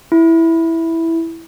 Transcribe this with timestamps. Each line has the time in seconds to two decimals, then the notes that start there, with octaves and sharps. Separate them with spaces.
0.12 E4